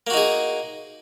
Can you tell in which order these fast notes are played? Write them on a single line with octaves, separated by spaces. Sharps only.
A#3 F#4 D#4 G#4